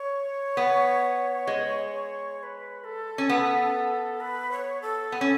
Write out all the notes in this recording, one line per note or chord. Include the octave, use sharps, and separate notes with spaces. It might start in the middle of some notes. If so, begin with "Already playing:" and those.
Already playing: C#5
B3
G#3
C#5
B4
A4
C#4
B3
B4
C#5
A4
B3
C#4